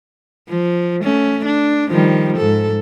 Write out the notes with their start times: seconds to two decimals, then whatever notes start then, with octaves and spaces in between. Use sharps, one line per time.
0.49 F3
1.03 A3 C#4
1.45 D4
1.91 D#3 F3 G3
2.37 G#2 A4